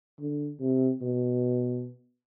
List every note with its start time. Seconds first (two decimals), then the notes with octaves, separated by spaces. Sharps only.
0.20 D3
0.61 C3
1.02 B2